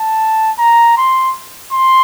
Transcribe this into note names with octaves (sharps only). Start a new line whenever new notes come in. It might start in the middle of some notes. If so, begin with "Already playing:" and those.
Already playing: A5
A#5
C6
C6